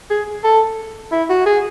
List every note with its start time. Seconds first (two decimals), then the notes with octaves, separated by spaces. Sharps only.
0.10 G#4
0.44 A4
1.11 E4
1.30 F#4
1.46 G#4